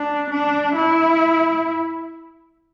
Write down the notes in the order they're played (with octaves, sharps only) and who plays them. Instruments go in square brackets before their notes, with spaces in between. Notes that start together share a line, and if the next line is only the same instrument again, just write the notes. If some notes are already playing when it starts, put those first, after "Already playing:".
Already playing: [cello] D4
D4
E4